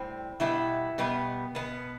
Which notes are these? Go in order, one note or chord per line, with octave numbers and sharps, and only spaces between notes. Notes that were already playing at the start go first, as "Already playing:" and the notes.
Already playing: A2 G3 C4
B2 G3 B3 E4
B2 G3 B3
B2 B3